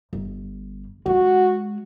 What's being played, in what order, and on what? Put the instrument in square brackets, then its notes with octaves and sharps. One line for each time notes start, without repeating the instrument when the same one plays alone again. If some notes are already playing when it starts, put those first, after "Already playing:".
[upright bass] G1
[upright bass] G#3 [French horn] F#4